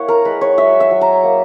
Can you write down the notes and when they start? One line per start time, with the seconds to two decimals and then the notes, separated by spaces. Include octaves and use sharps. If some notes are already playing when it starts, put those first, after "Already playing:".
Already playing: A#3 E4 C#5 F#5
0.08 A#4
0.25 G#3 B4
0.41 C#5
0.58 F#3 E5
0.80 E5
0.91 F#3
1.01 A#5
1.24 A#3